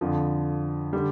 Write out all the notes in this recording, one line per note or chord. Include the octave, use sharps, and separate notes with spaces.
F2 D3 F3
D3 G3